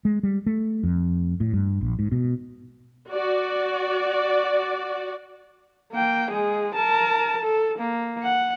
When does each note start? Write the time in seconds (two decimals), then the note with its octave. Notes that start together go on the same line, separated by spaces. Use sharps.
0.05 G#3
0.23 G3
0.46 A3
0.83 F2
1.40 A2
1.53 G2
1.81 A#1
1.99 G#2
2.12 B2
3.12 F#4 D5
5.92 A#3 G5
6.31 G#3 G#4
6.75 A#4 A5
7.41 A4
7.78 A#3
8.24 F#5